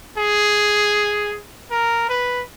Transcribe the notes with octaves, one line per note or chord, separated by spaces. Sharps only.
G#4
A#4
B4